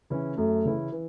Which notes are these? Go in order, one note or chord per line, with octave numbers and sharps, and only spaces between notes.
C#3 E3 C#4 E4
F#2 A3
C#3 E3 C#4 E4
E3